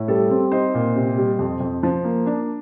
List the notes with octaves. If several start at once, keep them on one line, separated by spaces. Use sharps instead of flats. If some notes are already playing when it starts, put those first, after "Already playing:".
Already playing: A2
G3 A4
C4
D#4 C5 D#5
A#2
C3
G3
F2
F2
F3
A#3
D4